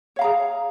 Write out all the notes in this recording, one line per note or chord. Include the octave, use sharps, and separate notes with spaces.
G#4 C#5 F5 A#5